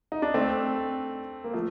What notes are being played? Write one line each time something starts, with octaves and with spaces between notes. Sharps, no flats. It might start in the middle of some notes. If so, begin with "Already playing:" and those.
D#4
D4
A3 C4
A#3
F3 A3